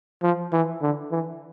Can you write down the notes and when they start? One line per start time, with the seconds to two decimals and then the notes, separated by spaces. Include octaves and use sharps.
0.23 F3
0.53 E3
0.82 D3
1.11 E3